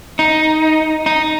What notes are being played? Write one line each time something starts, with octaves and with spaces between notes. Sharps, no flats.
D#4
D#4